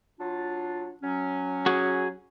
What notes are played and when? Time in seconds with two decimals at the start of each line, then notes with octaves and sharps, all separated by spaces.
0.19 F#3 D4 F4
1.02 F#3 C#4
1.66 F#4 G#4